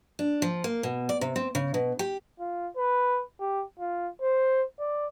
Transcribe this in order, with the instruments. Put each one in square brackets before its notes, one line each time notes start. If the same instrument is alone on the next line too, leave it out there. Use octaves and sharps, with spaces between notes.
[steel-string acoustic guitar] D4
F3
A#3
B2
D5
C3
C4
C#3
B2
G4
[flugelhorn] F4
B4
G4
F4
C5
D5